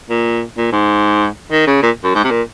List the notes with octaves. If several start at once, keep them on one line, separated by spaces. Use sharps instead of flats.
A#2
A#2
G#2
D#3
C#3
A#2
F#2
G#2
C3
A#2